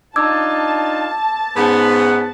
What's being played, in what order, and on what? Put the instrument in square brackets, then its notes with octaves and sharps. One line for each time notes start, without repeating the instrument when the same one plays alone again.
[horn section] D4 D#4 F4 [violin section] A5 [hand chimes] D6 E6 G#6
[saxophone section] G#2 B3 [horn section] C#4 D#4 F#5